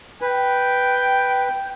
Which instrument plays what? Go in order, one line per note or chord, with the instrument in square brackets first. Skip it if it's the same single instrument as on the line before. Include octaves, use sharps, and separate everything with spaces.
[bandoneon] B4 [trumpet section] G5